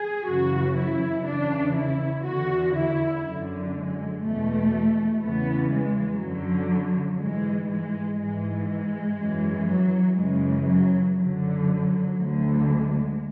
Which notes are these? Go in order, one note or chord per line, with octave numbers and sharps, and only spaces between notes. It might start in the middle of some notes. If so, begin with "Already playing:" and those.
Already playing: G#4
F#2 C#3 E3 F#4
E4
E2 C#3 E3 D4
E4
E2 D3 F#4
E4
F#2 D3
G#3
E2 B2 A3
E2 C#3 E3 B3
G#3
F#2 D3 F#3
G#2 E3 G#3
G#3
G#2 E3 G#3
G#3
F#2 E3
F#3
F#2 C#3 E3 G#3
F#3
F#2 D3 F#3
D2 D3
G#3